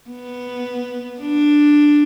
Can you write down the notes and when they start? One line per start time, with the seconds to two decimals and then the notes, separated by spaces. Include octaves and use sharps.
0.10 B3
1.21 D4